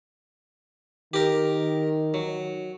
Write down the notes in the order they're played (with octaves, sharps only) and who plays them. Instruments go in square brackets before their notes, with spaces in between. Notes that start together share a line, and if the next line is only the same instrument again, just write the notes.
[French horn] D#3 [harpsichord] G4 A#4
[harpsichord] F#3